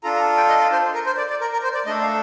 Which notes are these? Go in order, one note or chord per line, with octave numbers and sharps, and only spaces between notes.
D4 F4 A4 A#5
A#5
G5
D#5
D5
C5
A#4
C5
D5
D5
A#4
A#4
C5
D5
A3 D4 A4 D#5
F5